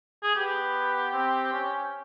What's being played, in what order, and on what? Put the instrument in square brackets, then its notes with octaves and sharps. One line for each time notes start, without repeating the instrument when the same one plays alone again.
[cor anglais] G#4
[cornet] B3 [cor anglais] G4
[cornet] C4
C#4